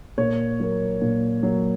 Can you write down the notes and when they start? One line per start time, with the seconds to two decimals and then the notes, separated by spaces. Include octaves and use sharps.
0.18 A#2 C#5
0.60 F#3 A#3
1.01 A#2
1.43 F#3 A#3